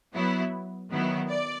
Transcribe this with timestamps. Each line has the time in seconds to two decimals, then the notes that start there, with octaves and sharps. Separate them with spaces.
0.14 F#3 B3 E4
0.91 D#3 F#3 B3 E4
1.30 D5